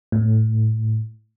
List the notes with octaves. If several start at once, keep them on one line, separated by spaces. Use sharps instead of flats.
A2